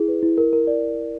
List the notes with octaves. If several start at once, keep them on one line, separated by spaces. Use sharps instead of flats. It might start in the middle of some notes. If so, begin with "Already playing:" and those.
Already playing: E4 G#4
B4
E4
A#4
A#4
D5